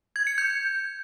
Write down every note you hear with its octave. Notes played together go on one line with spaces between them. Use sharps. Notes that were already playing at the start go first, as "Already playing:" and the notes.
G#6
C#7
G6